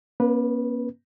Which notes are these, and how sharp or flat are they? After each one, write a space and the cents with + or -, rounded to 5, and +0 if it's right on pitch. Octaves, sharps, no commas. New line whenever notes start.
A#3 +35 C#4 -30 B4 -15